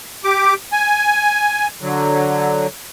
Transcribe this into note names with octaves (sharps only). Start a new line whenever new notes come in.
G4 D6
G#5
D3 F#3